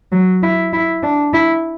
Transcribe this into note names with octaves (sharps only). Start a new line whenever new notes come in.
F#3
E4
E4
D4
E4